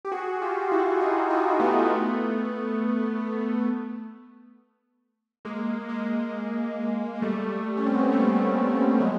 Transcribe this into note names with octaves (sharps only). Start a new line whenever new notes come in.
G4
F#4 G#4
F4 G4
E4 F#4
D#4 F4
D#4 F4
A3 B3
A3 B3
G#3 A#3
G#3 A#3
G#3
G3 A3
C#4
C4
B3
A#3
G3 A3
F#3 G#3